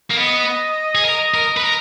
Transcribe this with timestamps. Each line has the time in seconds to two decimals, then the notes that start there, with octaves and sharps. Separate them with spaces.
0.11 A#3
0.17 B3 D#5
0.95 G#4
1.05 A#4
1.34 A#4
1.57 B4
1.64 A#4